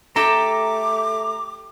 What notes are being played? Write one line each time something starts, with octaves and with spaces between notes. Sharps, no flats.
A3 G4 A4 G5 A#5 D6